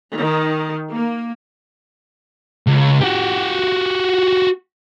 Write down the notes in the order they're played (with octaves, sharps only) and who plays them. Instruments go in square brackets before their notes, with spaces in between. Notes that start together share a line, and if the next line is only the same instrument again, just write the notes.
[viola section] D#3
A#3
[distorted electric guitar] C#2
F#4 G4